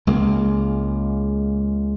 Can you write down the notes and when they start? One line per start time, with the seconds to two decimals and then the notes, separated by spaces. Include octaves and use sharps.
0.07 C#2 G#3 A#3